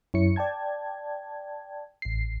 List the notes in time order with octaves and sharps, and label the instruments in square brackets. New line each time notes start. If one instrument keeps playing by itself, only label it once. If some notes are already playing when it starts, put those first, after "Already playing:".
[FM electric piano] F#2 E4 C#5 C#7
D5 G5 A5 G#6
A1 C7